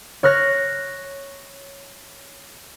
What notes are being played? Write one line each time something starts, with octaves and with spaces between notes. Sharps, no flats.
C#5 F6 F#6 A#6